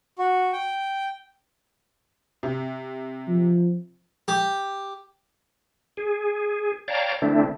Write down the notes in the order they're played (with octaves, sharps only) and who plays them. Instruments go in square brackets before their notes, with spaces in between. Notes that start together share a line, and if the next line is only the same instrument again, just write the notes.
[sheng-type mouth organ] F#4
G5
[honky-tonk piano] C3
[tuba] F3
[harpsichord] G4
[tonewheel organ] G#4
C#5 D5 F5 G5 A5 A#5
D3 A3 C4 D4 E4